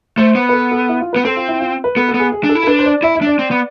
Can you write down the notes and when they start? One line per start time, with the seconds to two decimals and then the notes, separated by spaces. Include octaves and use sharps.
0.18 A3 C5
0.35 B3
0.49 B4
0.53 A4
0.72 A4
0.89 E4
1.01 F4
1.13 B3 B4
1.25 C4 A4
1.36 F4
1.48 E4
1.60 F4
1.84 B4
1.96 B3 A4
2.08 A4
2.14 B3
2.20 G#4
2.32 G#4
2.44 D4
2.49 A4
2.55 E4
2.63 A4
2.67 D4 B4
2.79 C5
2.86 D5
3.03 E4 E5
3.15 E5
3.22 D4
3.27 D5
3.39 C4
3.51 B3